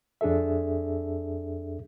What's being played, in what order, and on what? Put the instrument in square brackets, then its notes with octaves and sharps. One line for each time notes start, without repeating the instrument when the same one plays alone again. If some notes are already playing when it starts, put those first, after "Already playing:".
[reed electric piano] F2 D4 G#4 A4 E5